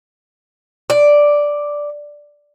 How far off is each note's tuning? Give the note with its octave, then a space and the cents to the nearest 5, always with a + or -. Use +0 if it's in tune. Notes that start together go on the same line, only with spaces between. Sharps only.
D5 +0